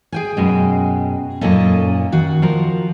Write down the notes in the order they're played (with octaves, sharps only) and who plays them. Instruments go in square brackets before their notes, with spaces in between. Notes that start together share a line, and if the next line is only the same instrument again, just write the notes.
[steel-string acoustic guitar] G#4 G5 G#5
[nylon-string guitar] F#2 B2 G#3
[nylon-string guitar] F#2 A#2 D#4 [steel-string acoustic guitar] C#4 A4 D#5
[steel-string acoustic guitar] D#3 F#4
[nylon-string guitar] F3 A#4